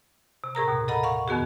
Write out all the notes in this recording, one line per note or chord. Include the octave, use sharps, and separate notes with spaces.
C3
A2 G#4 A#4 A#5
D#2 B2
A4 A#4 D#5 F#5 A#5 B5
F5 F#5 C#6
F2 D#3 B3 F#4 G#4